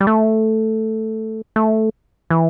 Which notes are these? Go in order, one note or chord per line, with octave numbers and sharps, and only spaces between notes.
G3
A3
A3
E3